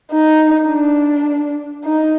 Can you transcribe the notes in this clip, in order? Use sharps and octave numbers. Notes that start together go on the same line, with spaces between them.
D#4
D4
D#4